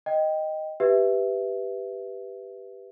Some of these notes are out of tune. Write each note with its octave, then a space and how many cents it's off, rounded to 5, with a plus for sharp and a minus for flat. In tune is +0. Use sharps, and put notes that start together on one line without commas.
D#5 +0 G5 +0
G4 +0 B4 +0 E5 +0